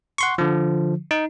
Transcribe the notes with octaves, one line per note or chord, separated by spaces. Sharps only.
F#5 C6 C#6
D3 F3
D#4